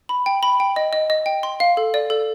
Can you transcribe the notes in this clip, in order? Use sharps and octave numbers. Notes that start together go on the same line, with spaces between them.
B5
G5
B5
G5
D#5
D#5
D#5
G5
C6
F5
A4
D5
A4